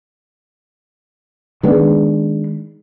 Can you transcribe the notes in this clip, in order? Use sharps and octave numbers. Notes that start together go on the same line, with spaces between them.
D#3 G#3 B3 D4